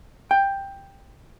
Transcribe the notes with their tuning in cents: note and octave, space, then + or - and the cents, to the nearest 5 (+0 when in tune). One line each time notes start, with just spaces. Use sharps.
G5 +10